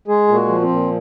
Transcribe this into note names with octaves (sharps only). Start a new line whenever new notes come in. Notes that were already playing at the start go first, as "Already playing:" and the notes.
G#3 G#4
A#2
F#4
F3
C4
A#2